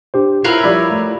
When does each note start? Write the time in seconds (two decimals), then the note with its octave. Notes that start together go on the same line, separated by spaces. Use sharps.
0.14 D4 G4 C5
0.44 E4 F4 A#4 B4 C#5 E6 C7
0.63 F3 G3 D5 B5 E6
0.91 A3